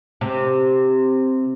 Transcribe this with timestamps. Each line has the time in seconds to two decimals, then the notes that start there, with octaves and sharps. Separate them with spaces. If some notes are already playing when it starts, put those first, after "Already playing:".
0.21 C3